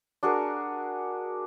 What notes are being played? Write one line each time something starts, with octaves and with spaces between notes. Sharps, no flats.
D4 F#4 G#4 A#4